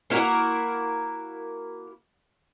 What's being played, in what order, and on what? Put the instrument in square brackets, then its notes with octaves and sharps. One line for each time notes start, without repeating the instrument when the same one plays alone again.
[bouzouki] A#3 E4 F#4 A#4